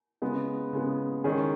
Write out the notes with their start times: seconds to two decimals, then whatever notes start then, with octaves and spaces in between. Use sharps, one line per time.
0.22 C#3 G#3 B3
0.73 C#3 G#3 B3
1.24 D#3 G#3 C#4 G#4